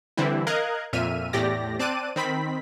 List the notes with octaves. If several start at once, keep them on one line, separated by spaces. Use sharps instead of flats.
D3 E3 G3 C4 E4
A#4 D#5 F5 A#5 F#6 G#6
F2 A#2 E5 F6 D#7
E2 A2 G4 D5 A#6
C4 D5 A5 D6 F#6 D#7
D#3 C4 B5 B6